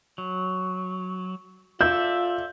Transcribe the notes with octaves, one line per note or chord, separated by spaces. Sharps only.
F#3
F4 A4 D5 E5 G6